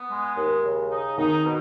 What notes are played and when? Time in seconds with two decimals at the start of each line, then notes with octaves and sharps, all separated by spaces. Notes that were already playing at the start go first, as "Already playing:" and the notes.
Already playing: B3
0.11 G#3
0.37 D#2
0.64 C#3
0.91 D#4
1.18 D#3 D#4
1.45 B2